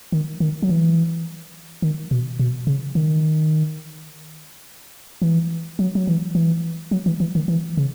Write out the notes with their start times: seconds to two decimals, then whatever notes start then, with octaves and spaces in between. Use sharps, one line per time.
0.12 D#3
0.40 D#3
0.63 F#3
0.69 E3
1.82 D#3
2.11 B2
2.39 B2
2.67 C#3
2.95 D#3
5.22 E3
5.79 F#3
5.95 F#3
6.07 E3
6.35 E3
6.91 F#3
7.06 E3
7.20 E3
7.35 D#3
7.48 E3
7.77 C#3